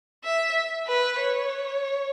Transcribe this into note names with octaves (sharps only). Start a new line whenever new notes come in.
E5
B4
C#5